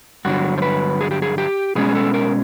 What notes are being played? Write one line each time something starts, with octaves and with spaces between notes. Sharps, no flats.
G2 D3 F#3 F#4
C5
B4
G#4
G4
G#4
G4
B2 G#3 C#4 G#4
A4
A#4